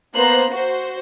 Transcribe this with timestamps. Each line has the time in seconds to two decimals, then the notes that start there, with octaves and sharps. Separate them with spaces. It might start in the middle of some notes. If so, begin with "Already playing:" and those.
0.15 A#3 B3 C5 A#5 C6 F#6
0.51 F#4 C5